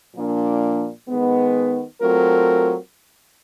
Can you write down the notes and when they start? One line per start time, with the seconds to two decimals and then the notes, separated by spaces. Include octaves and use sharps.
0.15 A#2 F3 A#3 D4
1.08 D#3 G#3 B3
2.01 F#3 A3 C4 F4 A#4